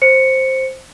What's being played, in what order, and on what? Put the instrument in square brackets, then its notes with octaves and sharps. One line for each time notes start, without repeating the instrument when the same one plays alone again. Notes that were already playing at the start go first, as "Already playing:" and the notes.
[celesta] C5 C#7